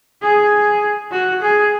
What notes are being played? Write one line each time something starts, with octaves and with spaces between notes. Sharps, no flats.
G#4
F#4
G#4